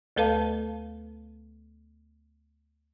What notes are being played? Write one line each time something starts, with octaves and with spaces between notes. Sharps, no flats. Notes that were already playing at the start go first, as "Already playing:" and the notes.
D2 A3 A4 B4 F5 A5